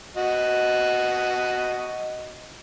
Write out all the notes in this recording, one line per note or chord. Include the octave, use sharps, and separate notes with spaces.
F#4 D#5